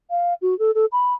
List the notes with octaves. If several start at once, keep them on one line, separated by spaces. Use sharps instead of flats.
F5
F#4
A4
A4
B5